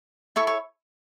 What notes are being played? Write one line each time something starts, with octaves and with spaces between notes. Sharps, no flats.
E4 A4 C#5 C#6
C#5 C#6